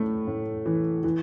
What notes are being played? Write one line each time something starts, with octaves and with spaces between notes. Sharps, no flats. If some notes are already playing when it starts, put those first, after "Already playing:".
Already playing: A2 A3
A2
E3
E3